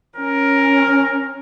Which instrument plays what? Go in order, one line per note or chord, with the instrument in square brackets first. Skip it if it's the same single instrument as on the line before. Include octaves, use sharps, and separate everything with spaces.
[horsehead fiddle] C#4 [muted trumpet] A#4